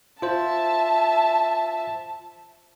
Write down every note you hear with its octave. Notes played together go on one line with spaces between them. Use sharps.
F4 C5 E5 A5